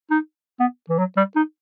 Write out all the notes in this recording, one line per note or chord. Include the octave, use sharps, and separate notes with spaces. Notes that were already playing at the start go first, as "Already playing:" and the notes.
D#4
B3
E3
F#3
G3
D#4